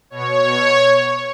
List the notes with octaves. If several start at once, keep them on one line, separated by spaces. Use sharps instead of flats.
B2 C#5
B2